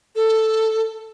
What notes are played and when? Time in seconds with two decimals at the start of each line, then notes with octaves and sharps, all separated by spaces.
0.16 A4